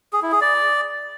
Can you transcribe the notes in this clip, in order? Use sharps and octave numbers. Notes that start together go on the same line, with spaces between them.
G#4
E4
G#4
D5